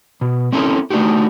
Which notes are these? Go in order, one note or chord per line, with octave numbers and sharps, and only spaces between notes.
B2
C4 C#4 E4 A4 A#4
A3 D4 D#4 F#4 G4